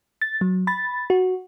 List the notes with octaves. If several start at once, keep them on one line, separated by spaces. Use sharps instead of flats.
A6
F#3
B5 A6
F#4